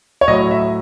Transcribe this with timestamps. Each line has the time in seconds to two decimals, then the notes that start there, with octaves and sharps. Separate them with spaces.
0.21 C#5
0.28 A2 F#3 D#5
0.51 E5